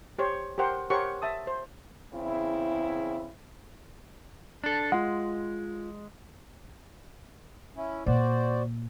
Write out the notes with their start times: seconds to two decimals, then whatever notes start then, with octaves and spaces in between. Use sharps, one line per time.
0.19 G4 C5 C#5
0.58 G4 A#4 C5 F#5 G5
0.90 G4 A#4 C5 C#5 F#5 C#6
1.22 E5 A5 D#6
1.47 C5
2.13 E2 C#3 C4 E4
4.64 D4 A4
4.92 G#3 F4 F#5
7.77 C#4 E4
8.06 A#2 F#4 C5 D5